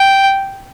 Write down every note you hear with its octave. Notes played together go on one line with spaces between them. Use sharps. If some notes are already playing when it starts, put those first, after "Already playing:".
Already playing: G5